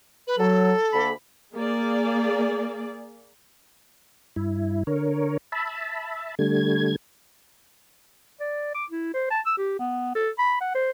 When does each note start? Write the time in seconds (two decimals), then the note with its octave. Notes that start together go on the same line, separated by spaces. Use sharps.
0.27 B4
0.38 F#3 A4
0.93 D2 A#3 B5
1.55 A#3 G#4 D5
4.36 G2 E4
4.87 D3 A#4 C#5
5.52 E5 A5 B5
6.39 D3 G3 A3 G#6
8.40 D5
8.74 D6
8.90 E4
9.14 C5
9.30 A5
9.46 E6
9.57 G4
9.79 B3
10.15 A4
10.38 B5
10.61 F#5
10.74 C5